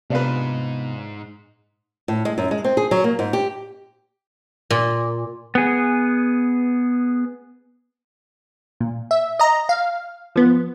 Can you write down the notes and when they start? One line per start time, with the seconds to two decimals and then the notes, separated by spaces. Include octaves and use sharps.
0.10 G#2 C3 B3 D4 F4 B4
2.08 A2
2.25 G#3
2.38 F#2
2.51 G#3
2.64 C4
2.77 G#4
2.91 F#3
3.04 A#3
3.19 G#2
3.33 G4
4.70 A#2
5.55 B3 G#4
8.80 A#2
9.11 E5
9.39 D#5 A#5
9.69 F5
10.36 F3 B3